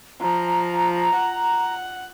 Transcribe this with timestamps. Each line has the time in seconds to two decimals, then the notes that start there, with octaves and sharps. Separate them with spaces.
0.21 F3 A#5
1.15 F#5